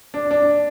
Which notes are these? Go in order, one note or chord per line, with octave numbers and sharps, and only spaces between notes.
D4
D4